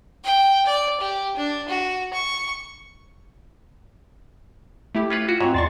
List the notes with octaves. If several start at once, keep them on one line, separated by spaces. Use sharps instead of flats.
G5
D5
G4
D4
F#4
C#6
A3 E4 G4
C#4 F4 B4
F4 F#4
G#2 C4 F#4 C#5
E2 D5 C6 C#6 A6